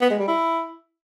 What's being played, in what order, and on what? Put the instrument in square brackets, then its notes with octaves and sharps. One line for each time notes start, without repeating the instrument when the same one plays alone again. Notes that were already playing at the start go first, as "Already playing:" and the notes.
[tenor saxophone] B3
G#3
G3
E4